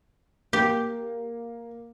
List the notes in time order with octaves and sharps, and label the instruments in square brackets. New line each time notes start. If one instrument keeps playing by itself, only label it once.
[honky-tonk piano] A#3 [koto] G4